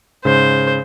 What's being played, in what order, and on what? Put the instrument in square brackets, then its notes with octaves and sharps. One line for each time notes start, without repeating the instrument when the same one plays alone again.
[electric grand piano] G#2 C#3 [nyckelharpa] C5